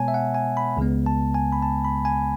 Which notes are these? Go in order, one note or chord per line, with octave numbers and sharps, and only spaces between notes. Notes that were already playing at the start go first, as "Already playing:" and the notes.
Already playing: B2 G#3 B3 C#5 G#5 A5
E5
F#5
G#5
B5
C#2 C#3 G#3 B3
A5
G#5
B5
A5
B5
G#5